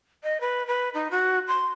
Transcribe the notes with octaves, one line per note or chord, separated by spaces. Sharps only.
D#5
B4
B4
D#4
F#4
C6